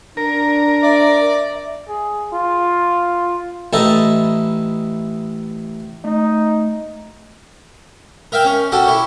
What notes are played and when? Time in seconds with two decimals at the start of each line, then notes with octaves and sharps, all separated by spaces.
0.17 D4 A#4
0.83 D5 E5
1.89 G#4
2.33 F4
3.73 A1 D#4 E4 A4 D#5
6.05 A3 D#4
8.32 A#4 E5 F5 G5
8.44 C#4 C#5
8.72 C#4 F#4 G4 A4 F#5
8.87 E4 G4 C#5